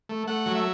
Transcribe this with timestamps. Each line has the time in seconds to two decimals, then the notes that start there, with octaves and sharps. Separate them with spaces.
0.09 A3
0.27 A3 F#5
0.46 F#3
0.55 E5